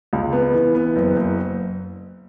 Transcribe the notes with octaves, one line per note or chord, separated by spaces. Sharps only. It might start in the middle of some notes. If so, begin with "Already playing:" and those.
C#2
B3
E3
B3
F#1
F#1